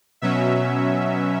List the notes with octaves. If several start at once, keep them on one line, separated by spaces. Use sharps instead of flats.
B2 F#3 C#4 E5